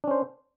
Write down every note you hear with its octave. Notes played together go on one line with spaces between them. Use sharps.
C#4 D4 C5